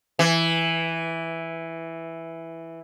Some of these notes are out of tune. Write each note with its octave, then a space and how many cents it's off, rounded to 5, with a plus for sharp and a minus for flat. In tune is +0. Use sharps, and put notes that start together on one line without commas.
E3 +0